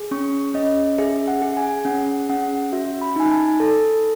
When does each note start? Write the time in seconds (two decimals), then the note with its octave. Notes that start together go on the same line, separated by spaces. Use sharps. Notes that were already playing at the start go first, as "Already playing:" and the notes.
Already playing: G#4
0.11 C#4 C#6
0.54 C#4 D#5
0.98 G#4 E5
1.28 F#5
1.42 G#4
1.57 G#5
1.85 C#4 F#5
2.30 C#4 F#5
2.72 F#4 E5
3.01 B5
3.16 D#4 G#5
3.31 A5
3.60 A4 A5